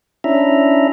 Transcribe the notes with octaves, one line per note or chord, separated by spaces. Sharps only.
C#4 D4 E4 E5 A#5